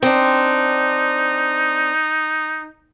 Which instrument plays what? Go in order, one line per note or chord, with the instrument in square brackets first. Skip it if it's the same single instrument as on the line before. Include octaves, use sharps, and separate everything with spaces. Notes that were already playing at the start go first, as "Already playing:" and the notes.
[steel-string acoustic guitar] C4 D4 [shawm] D#4